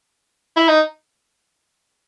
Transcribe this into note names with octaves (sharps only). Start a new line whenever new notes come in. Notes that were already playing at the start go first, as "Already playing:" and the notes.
E4
D#4